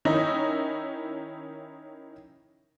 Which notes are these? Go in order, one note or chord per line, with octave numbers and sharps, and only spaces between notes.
D#3 C#4 D#4 E4